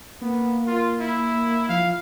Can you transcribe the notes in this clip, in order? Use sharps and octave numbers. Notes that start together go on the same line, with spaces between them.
A#3 B3
F4
E4
F3 F5